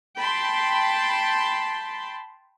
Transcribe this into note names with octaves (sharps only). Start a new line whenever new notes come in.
G5 A5 B5 C6